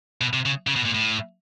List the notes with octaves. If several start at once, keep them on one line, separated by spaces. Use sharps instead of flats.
B2
C3
C#3
C#3
B2
A#2
A2